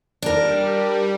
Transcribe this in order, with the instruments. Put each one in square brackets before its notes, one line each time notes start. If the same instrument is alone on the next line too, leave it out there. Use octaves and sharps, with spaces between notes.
[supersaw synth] G3 [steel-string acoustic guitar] D4 A#4